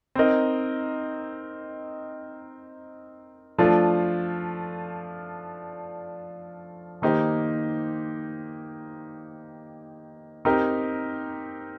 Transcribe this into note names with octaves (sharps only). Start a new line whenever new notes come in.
C4 D#4 A#4 D#5
F3 A3 D4 F4
D#3 A#3 D#4 G4 C5
C4 D#4 G4 A#4